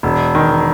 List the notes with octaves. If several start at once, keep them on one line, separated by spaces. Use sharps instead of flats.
E1
D#3